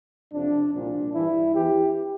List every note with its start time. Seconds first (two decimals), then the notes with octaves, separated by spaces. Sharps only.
0.32 F2 C3 F3 D4
0.73 C2 A#2 F3 D4
1.14 G2 E3 E4
1.54 E2 E3 G4